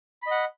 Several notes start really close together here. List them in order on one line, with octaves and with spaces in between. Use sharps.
B5 D#5 F#5